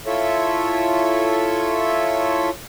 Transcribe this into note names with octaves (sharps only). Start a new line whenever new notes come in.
E4 F4 A4 C#5 E5